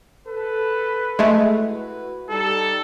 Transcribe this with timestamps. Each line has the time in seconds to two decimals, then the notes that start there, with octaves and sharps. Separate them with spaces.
0.28 A4 B4
1.19 G#3 A3
1.56 E4 F#4 B4
2.30 G3 D#4 A4